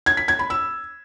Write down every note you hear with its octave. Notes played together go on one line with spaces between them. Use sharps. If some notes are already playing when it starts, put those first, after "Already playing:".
G#6
B6
G#6
B5
E6